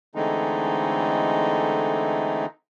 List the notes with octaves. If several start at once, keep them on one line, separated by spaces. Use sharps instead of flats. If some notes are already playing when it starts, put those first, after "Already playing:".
D3 E3 G#3 A3 C4 D#4